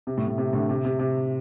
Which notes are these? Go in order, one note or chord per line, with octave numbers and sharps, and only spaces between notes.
C3
A2
A2
C3
A2 D3
C3
C3
C3